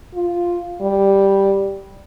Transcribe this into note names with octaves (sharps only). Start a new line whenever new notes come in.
F4
G3